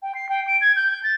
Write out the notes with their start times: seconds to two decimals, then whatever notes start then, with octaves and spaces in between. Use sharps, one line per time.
0.02 G5
0.15 C7
0.29 G5
0.47 D7
0.61 G#6
0.76 G6
0.91 G6
1.03 A6